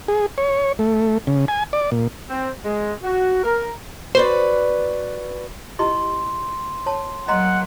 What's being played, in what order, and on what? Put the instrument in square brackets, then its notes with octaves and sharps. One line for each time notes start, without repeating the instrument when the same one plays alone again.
[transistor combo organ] G#4
C#5
A3
C#3
G#5
D5
A#2
[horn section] C4
G#3
F#4
A#4
[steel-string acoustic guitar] F#4 B4 D5 [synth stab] C5
[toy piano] E4 G4 D#5 [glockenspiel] C6
[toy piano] C#5 A5
[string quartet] F#3 A#3 [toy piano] D#5 A#5 C6 [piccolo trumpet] F#5